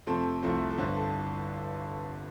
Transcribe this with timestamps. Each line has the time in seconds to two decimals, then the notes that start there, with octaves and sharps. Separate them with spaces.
0.07 F2 C3 F3 A3 C4 A4
0.43 C2 C3 F3 A3 C4
0.70 A4
0.78 G1 G2 D3 C5
0.96 A4